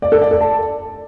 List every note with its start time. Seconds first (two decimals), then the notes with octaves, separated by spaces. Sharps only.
0.02 D5
0.12 A4
0.21 D5
0.31 A4
0.41 A5